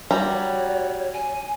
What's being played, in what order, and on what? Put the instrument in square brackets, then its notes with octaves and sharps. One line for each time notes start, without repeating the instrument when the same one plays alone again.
[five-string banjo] G3 A#5 [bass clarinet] F#4 [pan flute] C#5
[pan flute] G#5